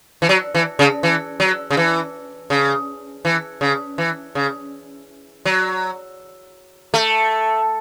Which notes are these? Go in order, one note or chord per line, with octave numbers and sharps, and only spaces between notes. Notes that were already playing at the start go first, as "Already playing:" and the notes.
E3
F#3
E3
C#3
E3
F#3
C#3
E3
C#3
E3
C#3
E3
C#3
F#3
A3